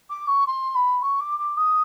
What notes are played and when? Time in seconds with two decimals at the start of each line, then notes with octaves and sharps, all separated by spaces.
0.10 D6
0.27 C#6
0.47 C6
0.75 B5
1.02 C#6
1.20 D6
1.39 D6
1.57 D#6